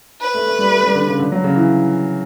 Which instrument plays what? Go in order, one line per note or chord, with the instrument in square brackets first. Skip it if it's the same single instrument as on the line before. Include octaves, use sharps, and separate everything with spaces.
[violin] B4
[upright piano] A3
A3
G3
A3
G3
D3
C#3
D3
F#3
C#3
E3